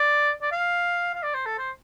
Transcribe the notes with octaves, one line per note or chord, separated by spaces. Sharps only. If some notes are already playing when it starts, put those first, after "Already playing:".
Already playing: D5
D5
F5
F5
D5
C5
A4
C5